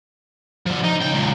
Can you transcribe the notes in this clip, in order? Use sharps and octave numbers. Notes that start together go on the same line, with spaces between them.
D3 F3
D#4
C#2 G5
C#2 A#2